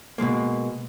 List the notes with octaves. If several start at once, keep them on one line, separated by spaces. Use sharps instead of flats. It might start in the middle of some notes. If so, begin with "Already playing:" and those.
B2 F3 G#3 A#3